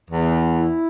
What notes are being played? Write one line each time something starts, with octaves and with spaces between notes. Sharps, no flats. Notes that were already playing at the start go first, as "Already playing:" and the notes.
E2
E4